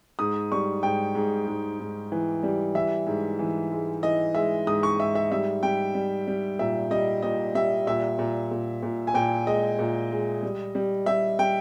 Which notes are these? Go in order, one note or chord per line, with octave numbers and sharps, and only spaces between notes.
G#2 D#6
G3 C#6
G#2 G5
G#2
G#2
G#2
E3
G3
E3 E5
G#2
E3
G#3
E3 D#5
G#3 E5
G#2 D#6
C#6
G#2 E5
E5
G3 E5
G3 G5
G3
G3
A#2 E5
G3 D#5
A#2 D#5
G3 E5
A#2 E5
A#2
A#2
A#2
G#5
A#2 G5
G#3 D#5
A#2
G#3
G3
G3
G3 E5
G3 G5